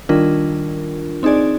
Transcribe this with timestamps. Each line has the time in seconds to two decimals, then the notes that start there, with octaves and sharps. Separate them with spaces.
0.09 D#3 G3 D4 F4 A#4
1.23 C4 D#4 G#4 D5